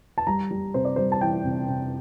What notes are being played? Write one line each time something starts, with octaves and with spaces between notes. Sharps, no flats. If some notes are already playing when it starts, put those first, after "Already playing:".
A5
G3 A#5
G3
C3 C5
D5
G3 C5
A5
E3 G5
C3
C3